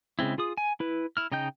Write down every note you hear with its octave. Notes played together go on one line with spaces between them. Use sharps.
C#3 G#3 C4 E4
F4 G#4 D#6
G#5
E4 B4
E4 F6
C#3 D#4 D#5 G5 G6